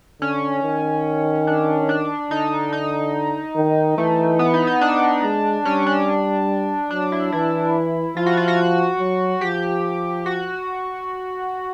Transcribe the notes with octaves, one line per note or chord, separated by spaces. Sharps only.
D3 C#4
D#3
D4
D4
D3 D#4
D#4
D#3
E3 A3
B3
D#4
D#4
D4
G#3
G3 C#4
D4
F#3 D4
E4
E3 E4
F3 F4
F#4
F4
F#4
F#3
F3 G4
F#4